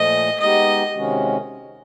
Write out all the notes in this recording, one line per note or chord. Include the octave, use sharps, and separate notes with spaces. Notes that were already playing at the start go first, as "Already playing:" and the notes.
Already playing: A#2 F3 A3 D#5
G#3 B3 D#4 G4 D#5
C3 D#3 G#3 C#4 F#4